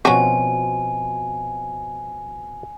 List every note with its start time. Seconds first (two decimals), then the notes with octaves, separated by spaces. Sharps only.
0.05 B2 F3 C4 C#4 F#4 G#5